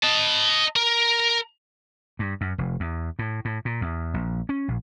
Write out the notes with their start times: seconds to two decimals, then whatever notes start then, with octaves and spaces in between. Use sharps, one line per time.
0.03 D#5 A5
0.76 A#4
2.19 G2
2.41 F#2
2.58 F1
2.80 E2
3.19 A2
3.45 A2
3.65 A#2
3.81 E2
4.14 A#1
4.49 C#4
4.68 A#1